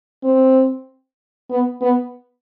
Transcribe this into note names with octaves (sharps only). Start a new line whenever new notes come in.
C4
B3
B3